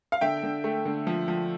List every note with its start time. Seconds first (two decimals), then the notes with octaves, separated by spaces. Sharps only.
0.12 F5
0.21 D3 E5 G5
0.43 D3
0.64 A3
0.86 D3
1.07 F3
1.28 F3